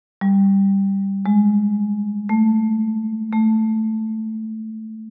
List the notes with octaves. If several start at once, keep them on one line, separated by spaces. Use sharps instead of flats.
G3
G#3
A3
A3